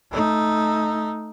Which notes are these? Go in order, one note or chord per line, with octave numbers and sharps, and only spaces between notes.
A3 D#4